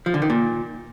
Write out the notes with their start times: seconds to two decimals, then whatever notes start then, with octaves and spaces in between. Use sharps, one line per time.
0.06 F3
0.14 D3
0.22 D#3
0.30 A#2